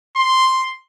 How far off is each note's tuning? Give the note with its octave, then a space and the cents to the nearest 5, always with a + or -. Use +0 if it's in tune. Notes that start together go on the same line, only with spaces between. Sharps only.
C6 +0